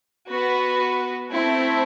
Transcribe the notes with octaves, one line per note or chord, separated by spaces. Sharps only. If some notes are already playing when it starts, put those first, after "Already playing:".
B3 F#4 B4
A3 C4 E4